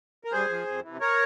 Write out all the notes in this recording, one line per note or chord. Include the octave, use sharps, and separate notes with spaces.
A#4
G2 G#4 C5
F3
F2
C3 E3
A#4 C#5